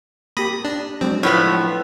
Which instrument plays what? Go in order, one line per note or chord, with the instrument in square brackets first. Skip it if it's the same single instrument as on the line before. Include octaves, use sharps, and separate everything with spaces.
[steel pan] A#3 G4 [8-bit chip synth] B5 D#6 A#6
[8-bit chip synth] D4
[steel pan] F#3 G#3 D4 [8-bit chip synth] C4
[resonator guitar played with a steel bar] A2 F3 B3 [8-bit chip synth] C#5 B5